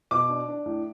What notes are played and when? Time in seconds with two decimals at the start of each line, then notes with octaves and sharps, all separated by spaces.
0.11 B2 D6
0.29 D4
0.48 D4
0.66 A2